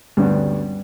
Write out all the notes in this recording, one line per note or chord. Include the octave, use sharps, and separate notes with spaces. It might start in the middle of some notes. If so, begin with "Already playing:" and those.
D2 G2 D3 G3 B3 C#4